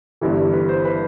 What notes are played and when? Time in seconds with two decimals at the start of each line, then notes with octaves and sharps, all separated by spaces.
0.21 G1 G2 E3 E4
0.38 E4
0.53 B4
0.69 C5
0.85 B4